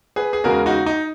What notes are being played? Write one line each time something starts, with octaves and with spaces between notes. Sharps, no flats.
G#4 B4
G#4
E2 C#3 G#3 F#4 A#4
D#4 F#4
D#4